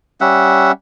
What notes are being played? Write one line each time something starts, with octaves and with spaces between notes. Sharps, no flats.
G3 C#4 E5 F#5